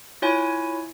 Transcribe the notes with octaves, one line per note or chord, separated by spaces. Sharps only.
E4 F4 C#5 G#5